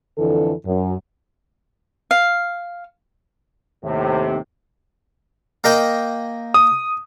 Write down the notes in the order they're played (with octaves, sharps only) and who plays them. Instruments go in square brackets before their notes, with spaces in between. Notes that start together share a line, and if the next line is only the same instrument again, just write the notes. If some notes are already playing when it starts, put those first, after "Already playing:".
[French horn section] F2 D3 E3 A4
F#2
[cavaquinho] F5
[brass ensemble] D#2 A2 C3
[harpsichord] A#3 D#5 G5
[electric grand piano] D#6